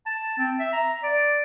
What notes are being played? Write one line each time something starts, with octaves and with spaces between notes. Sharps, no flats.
A5
C4
E5
A#5
D5